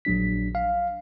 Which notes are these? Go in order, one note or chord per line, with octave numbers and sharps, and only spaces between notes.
A#1 F#3 D4 B6
F5